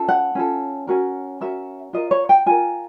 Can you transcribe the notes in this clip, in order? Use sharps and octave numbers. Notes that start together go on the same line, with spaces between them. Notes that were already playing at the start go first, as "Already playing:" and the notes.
Already playing: C#4 F4 A4
F#5
C#4 F4 A4
C#4 F#4 A#4
C#4 F#4 A#4 E5
F4 A#4 D#5
C#5
G5
F4 A#4 G#5